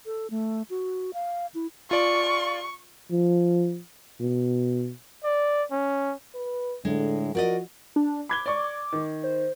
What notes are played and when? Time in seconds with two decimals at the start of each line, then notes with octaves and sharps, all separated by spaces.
0.06 A4
0.30 A3
0.70 F#4
1.14 F5
1.55 E4
1.91 F4 D5 C#6
3.11 F3
4.20 B2
5.24 D5
5.71 C#4
6.35 B4
6.85 A2 D3 G#3
7.35 F3 F#4 A#4 D5 D#5
7.96 D4
8.29 B5 D6 G#6 G7
8.46 D5 C#6
8.64 D6
8.92 D#3
9.24 C5